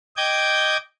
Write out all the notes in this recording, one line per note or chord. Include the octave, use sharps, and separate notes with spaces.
D#5 G5 D6 G6 G#6